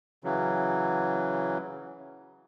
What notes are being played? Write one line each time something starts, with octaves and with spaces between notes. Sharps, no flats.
C#3 E3 F#3